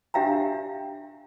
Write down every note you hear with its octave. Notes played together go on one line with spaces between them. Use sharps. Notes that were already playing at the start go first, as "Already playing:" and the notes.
D4 G4 E5 F5 G5 A#5